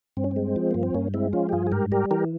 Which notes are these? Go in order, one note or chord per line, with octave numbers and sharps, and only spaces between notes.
G2 C4
C#4
C4
G#3
F3
G2 A#3
C4
G2 A#3 C#4
G#3 C4 E4
F3 C#4 F4
G4
G2 F4 G#4
G#4
G#2 G4 A#4
G3 G4 A#4
E3 G4 A#4